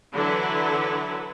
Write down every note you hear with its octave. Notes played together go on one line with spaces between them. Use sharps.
D3 E3 F#3 E4 B4